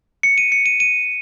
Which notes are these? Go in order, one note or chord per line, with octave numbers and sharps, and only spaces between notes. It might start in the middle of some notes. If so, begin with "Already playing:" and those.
C#7
D#7
C#7
D#7
D#7